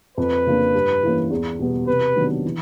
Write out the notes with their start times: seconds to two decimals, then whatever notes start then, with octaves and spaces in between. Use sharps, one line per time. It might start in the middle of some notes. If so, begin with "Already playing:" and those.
0.17 F2 B4
0.46 C#3 F3 A#3 D4
0.74 G2
1.03 E3 G3 A#3 C#4
1.31 E2
1.59 B2 G3 B3
1.87 C3 B4
2.16 D#3 F#3 B3 D4
2.44 E3